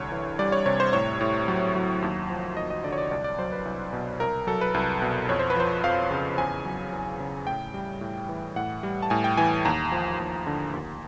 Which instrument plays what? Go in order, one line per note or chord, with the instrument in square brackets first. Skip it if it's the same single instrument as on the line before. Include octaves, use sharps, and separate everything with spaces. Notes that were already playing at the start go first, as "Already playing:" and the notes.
Already playing: [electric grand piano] C2 D3 C#5
E3
G3 D5
C#5
C3 C#5
C5
A2 C#5
A2
F#3
F#3
D#2
F3
D#2 D#5
D#5
D3 D5
C#5
D5
C2 D5
D5
F#3 C5
B4
C2
B2
C2 A#4
F#3 A4
B4
C2 B4
B2
F2 C#5
C5
B4
F3 C5
F2 F5
C#3
E2 G#5
F#3
E2
C#3
A2 G5
G3
A2
E3
A2 F#5
G3
A5
A2 G#5
G5
E3 G#5
D#2 A#5
F3
D#2
D3
D#2